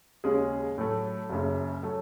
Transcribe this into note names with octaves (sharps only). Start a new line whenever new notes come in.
D#2 C#3 G#3 C#4 G#4
A2 F#3 A3
F#1 F#2 C#3
F#3 A3